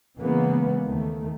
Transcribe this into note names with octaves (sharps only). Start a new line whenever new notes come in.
C#3 E3 G#3 A#3 B3
D#2 D#3 A3